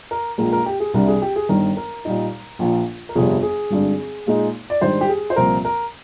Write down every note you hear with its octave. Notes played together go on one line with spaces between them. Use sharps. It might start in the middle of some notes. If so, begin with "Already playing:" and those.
A#4
A#1 A#2 G#3 A#4
A#4
G4
G#4
C2 C3 G3 D4 A#4
G#4
G4
G#4
G1 G2 D#3 A#4
A#4
A#2 G3 A#3 D#4
A#1 A#2 F3 A#3
A#4
G1 F2 C3 G3 G#4
G#4
G#1 G2 D3
A#2 G#3 D#4
D5
G#2 D#3 G3 D4 C5
G4
G#4
C5
C2 A#2 F3 C4 A#4
A#4